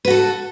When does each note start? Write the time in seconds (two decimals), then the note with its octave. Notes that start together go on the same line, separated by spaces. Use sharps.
0.05 B4
0.08 F#4
0.10 A4